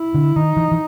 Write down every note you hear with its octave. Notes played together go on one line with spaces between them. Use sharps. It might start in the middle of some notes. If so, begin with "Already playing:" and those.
Already playing: E4
D3
D#3 D#4
E3
E3